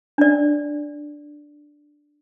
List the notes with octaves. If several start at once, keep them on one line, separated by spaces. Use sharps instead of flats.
D4 D5